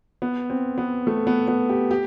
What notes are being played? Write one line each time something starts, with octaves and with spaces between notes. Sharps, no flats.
B3
C4
B3
A3
B3
B3
G4
G4